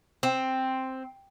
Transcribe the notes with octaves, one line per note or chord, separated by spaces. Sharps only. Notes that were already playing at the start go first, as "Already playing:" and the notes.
C4